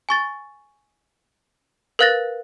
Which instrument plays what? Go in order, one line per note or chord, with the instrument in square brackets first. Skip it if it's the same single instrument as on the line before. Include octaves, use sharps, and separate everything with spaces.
[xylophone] G#5 C#6 A6
A#4 B4 F5 F#6 A6 A#6